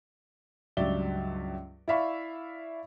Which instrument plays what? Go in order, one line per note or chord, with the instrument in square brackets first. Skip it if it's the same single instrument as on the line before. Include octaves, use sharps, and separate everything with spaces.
[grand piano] C#2 G2 F#3 D5 E5 G7
E4 D5 E5 F5 B5 C#6